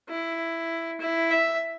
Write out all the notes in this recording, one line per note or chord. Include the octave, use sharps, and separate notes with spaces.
E4
E4
E5